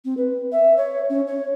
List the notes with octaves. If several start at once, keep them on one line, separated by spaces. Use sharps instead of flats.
C4
B4
E5
C#5
C#4
C#5